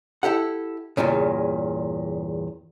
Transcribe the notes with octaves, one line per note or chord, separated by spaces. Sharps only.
E4 G4 A4 F#5
E2 G2 A#2 C#3